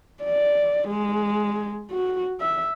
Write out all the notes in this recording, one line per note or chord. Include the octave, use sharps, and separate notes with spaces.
D5
G#3
F#4
E5